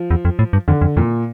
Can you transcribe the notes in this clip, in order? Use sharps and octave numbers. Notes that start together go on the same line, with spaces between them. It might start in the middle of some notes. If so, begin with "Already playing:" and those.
Already playing: F3
E2
F2
A2
G2
F2 D3
F2
F2 A#2